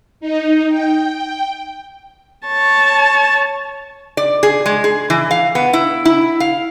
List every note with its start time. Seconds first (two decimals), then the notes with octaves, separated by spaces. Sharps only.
0.20 D#4
0.69 G5
2.47 C#5 A5
4.17 D5
4.43 G#4
4.66 G#3
4.84 G#4
5.10 E3
5.31 F5
5.55 B3
5.73 E4
6.05 E4
6.40 F5